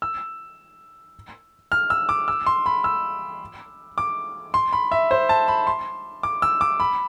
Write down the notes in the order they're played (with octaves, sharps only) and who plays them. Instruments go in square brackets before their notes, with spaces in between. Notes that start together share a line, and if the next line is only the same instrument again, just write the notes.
[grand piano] E6
F6
E6
D6
E6
C6
B5
E6
D6
C6
B5
E5
C5
A5
B5
C6
D6
E6
D6
B5